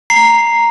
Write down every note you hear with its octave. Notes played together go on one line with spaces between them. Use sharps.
A#5 C7